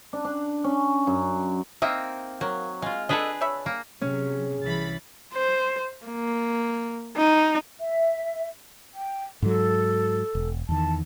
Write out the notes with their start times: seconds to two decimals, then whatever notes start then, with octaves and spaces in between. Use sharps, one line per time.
0.13 D4
0.24 D4
0.64 C#4
1.07 F#2
1.82 A#3 C4 D#4 D#5 E5
2.41 F#3 A#3
2.82 G#3 F4 F5
3.09 D4 G#4 A4 B4 D#5
3.41 C#5 E5 B5
3.66 A#3
4.01 C3 F#3 C#4 G#4
4.62 C2 E3 B5 A6
5.34 C5
6.06 A#3
7.17 D#4
7.80 E5
8.94 G5
9.42 G#2 F#3 A4
10.35 E1
10.69 E2 D#3 A5